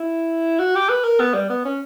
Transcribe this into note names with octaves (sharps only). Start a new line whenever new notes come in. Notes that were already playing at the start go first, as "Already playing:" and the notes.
Already playing: E4
F#4
G4
B4
A#4
B3
G3
B3
C#4